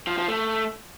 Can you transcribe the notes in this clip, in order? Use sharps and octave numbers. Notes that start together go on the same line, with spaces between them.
F3
F3
A3